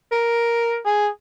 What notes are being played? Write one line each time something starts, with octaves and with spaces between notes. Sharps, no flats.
A#4
G#4